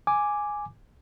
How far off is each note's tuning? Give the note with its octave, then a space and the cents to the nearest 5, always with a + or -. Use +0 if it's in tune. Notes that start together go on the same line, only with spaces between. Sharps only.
G#5 +0 D6 +0